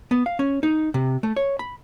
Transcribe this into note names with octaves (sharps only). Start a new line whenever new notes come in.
B3
F5
C#4
D#4
C3
A3
C#5
B5